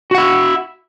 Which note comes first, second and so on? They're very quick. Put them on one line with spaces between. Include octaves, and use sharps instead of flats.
F#4 F#5 E4